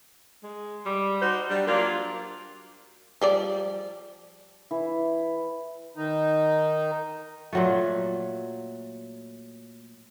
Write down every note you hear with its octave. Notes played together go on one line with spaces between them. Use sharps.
G#3
G3
D#4 F#4 C5
G3 D4
F#3 A#3 D4 F4
F3 G3 D5
E3
D#3 D#4
A#2 F#3 A3